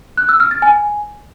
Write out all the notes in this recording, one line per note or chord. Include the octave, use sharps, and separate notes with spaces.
F#6
E6
F6
A6
G#5